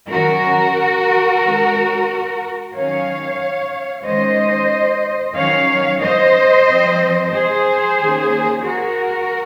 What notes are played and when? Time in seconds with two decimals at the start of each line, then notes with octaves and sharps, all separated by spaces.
0.10 D#3 F#3 C#4 F#4 A#4
1.42 C3 D#3 G#3 C#4
2.73 D#3 F#3 C#4 C#5 F5
4.04 D#3 G#3 C#4 C5 D#5
5.36 D#3 F#3 C#4 C#5 F5
6.01 C5 D#5
6.67 F3 C4
7.32 G#4 C5
7.98 D#3 A#3 C#4
8.63 F#4 A#4